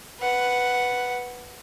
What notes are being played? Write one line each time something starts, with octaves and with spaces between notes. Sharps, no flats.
B4 F#5